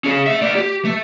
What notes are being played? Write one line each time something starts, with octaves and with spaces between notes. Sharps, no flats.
C#4 G#4
A3 E5
A3 D5
G4
A3